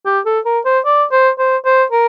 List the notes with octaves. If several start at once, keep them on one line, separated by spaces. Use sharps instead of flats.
G4
A4
A#4
C5
D5
C5
C5
C5
A#4